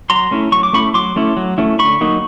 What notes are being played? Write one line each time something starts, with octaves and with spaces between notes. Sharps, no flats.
F#3 A#5 C6
A3 C#4 E4
F#3 C#6
D6
A3 C#4 E4 B5 C#6
F#3 C6 D6
A3 C#4 E4
F#3
A3 C#4 E4
D3 B5 C#6
F#3 A#3 D#4